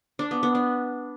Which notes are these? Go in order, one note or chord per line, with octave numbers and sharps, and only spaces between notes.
D4
B3
B3
D4